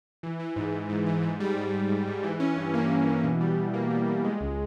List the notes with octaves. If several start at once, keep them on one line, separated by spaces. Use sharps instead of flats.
E3
E3
G#2
G#2
G#2
E3
G#2
G3
G#2
G#2
G#2
G#2
E3
C#4
G2
A#3
G2
E3
B2
G3
B2
A#3
G3
G3
G#3
C#2